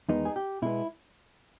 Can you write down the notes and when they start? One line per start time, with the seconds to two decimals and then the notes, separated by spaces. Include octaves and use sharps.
0.09 E2 D#3 G#3 B3 D#4
0.25 G#4
0.36 G4
0.62 B2 G#3 B3 E4